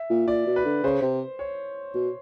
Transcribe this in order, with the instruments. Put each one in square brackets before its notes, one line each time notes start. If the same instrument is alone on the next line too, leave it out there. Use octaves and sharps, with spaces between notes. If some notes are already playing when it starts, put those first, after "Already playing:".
Already playing: [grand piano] E5
[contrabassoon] A#2
[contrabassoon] A#2 [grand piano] D5
[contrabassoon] B2
[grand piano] B4
[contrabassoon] D3
[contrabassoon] C#3 [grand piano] C5
[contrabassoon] C3
[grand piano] C#5
[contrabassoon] B2